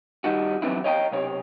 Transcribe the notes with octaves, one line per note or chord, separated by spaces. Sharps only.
D#3 G3 D#4 F#4
E3 F#3 B3 C4 D4 E4
C#5 D#5 F5 G5 A5 A#5
B1 C3 C#5